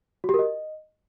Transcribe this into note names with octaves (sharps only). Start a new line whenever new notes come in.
F#4
G4
A#4
D#5